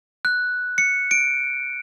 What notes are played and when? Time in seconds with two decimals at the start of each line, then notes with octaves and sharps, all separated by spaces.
0.25 F#6
0.78 C#7
1.11 D7